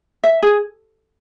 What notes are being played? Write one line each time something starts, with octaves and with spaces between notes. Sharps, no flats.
E5
G#4